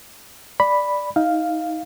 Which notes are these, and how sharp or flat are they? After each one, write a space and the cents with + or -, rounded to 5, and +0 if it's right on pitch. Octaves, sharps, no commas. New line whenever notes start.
D5 +0 B5 +0
D#4 +25 F5 +0